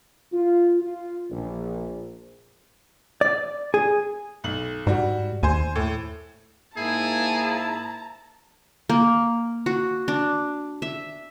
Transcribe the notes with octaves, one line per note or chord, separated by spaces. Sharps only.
F4
F4
A#1
D5
G#4
B1 F#7
G#2 G3 F#4
D#2 C5 G#5
A2
G#2 A#3 E4 G#4 A5 A#5
A#3
F#4
D4
E5